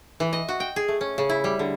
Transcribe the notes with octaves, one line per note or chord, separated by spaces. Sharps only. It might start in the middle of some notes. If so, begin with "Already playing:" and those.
E3
D#5
F#4
G5
G#4
A3
C#4
C#3
E4
G3
D3